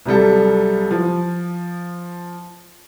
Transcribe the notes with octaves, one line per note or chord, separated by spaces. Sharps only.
C2 F#3 G3 A4
F3